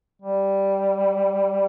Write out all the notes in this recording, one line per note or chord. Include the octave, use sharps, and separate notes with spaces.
G3